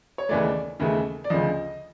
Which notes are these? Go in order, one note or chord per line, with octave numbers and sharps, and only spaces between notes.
C#5
D#2 C#3 E3 A3 D5
D#2 C#3 E3 A3
D5
D2 C#3 F3 D#5